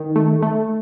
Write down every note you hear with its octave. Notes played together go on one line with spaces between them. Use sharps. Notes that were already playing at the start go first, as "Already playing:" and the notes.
Already playing: D#3
A3
A3